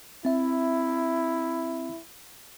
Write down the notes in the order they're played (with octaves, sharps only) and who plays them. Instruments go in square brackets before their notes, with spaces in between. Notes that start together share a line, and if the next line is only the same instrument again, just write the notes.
[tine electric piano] C4 E5 [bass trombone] E4